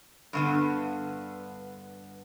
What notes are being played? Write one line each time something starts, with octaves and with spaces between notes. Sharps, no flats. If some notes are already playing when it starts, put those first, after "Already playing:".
G2 D3 B3